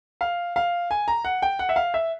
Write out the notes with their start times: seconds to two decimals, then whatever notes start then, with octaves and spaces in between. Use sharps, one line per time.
0.21 F5
0.56 F5
0.91 G#5
1.08 A#5
1.25 F#5
1.42 G5
1.59 F#5
1.69 E5
1.76 F5
1.94 E5